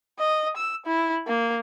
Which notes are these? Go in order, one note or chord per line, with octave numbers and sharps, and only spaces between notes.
D#5
E6
E4
A#3